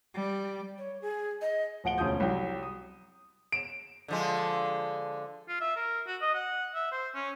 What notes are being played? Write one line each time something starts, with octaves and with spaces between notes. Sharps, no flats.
G3
C#5
G#4
D#5
D1 F3 F#5 D7 G7
E1 D2 F3 C#4 D#6 G6
C2 F#3 G5
D#6
D7 E7
D3 F3 G#3
F4
E5
A#4
F#4
D#5
F#5
E5
C5
C#4